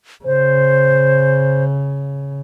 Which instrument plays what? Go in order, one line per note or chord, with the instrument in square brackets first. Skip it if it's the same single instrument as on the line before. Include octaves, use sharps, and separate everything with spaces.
[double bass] C#3 [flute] C5